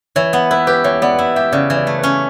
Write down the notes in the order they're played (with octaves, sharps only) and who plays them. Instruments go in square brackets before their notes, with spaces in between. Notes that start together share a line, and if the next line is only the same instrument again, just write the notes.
[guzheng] E3 [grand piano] C#5
[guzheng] B3
[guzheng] E4 [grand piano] B4
[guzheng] G4 [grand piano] B4
[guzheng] E3 [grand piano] C#5
[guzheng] B3 [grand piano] D5
[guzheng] E4 [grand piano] E5
[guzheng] G4 [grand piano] E5
[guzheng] C#3 [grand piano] D5
[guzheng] E3
[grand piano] D5
[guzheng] A3
[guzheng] C#4 [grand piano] B4